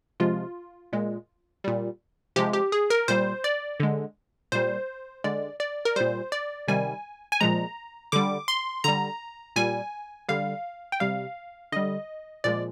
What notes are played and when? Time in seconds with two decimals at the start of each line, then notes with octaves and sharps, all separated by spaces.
0.20 C3 F3 G#3 F4
0.93 A#2 G#3
1.64 A#2 G3
2.36 C3 F3 G#3 G4
2.53 G4
2.72 G#4
2.90 A#4
3.08 A#2 G3 C5
3.44 D5
3.80 D3 G#3
4.52 A#2 G3 C5
5.24 D3 G#3 D5
5.60 D5
5.85 A#4
5.96 A#2 G3 C5
6.32 D5
6.68 C3 D#3 G3 G#5
7.32 G#5
7.41 A#2 F3 G#3 A#5
8.12 D3 G3 D6
8.48 C6
8.84 D3 G3 A#5
9.56 A#2 G3 G#5
10.29 D3 G3 F5
10.92 G5
11.00 C3 G3 F5
11.72 D3 G3 D#5
12.44 A#2 F3 G#3 D5